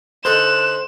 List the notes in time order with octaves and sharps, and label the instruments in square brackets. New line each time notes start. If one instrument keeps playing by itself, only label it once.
[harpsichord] D3 D#4 A4 [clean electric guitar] C5 [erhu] F#6 [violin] E7